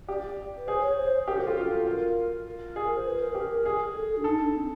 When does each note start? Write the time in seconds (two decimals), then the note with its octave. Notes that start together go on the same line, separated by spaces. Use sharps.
0.08 G4 D5
0.57 B4
0.67 G#4 C5
0.82 C#5
0.98 C5
1.27 G4 A#4
1.37 F#4
1.42 F4 A4
1.57 F4
1.86 F4 A#4
2.47 A#4
2.76 G#4
2.95 C5
3.06 B4
3.20 A#4
3.35 G4 A#4
3.65 G#4
3.95 A4
4.10 A4
4.17 D4
4.24 D#4 A4
4.40 D4
4.54 C4